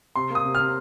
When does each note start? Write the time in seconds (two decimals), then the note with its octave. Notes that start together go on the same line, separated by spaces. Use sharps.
0.16 C3 C6
0.30 A#3 D#6
0.45 C3
0.55 F6
0.60 C3